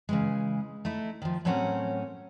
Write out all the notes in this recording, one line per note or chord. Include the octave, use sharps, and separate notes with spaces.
C#3 E3 G#3
A3 D#4 E4
D#3 F3
A2 F#3 C4 C#4 A#4 F#5